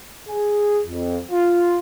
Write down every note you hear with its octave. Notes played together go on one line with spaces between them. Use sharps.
G#4
F2
F4